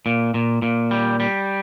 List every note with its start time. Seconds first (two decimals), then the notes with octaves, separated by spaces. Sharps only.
0.06 A#2
0.34 A#2
0.62 A#2
0.91 G3
1.20 G3